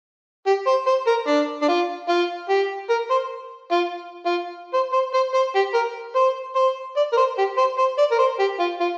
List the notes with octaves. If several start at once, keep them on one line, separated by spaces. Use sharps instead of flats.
G4
C5
C5
A#4
D4
D4
F4
F4
G4
A#4
C5
F4
F4
C5
C5
C5
C5
G4
A#4
C5
C5
D5
A#4
C5
G4
C5
C5
D5
A#4
C5
G4
F4
F4